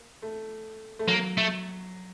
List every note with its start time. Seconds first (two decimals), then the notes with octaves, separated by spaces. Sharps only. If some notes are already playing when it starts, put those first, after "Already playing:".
Already playing: A#3
0.22 A3
0.99 A3
1.08 F#3 A#3
1.38 A3